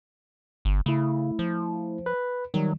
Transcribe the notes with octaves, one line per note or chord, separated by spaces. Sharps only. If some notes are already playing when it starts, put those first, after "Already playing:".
G1
C#3 A3 E4
F3
B4
D#3 F#3 G3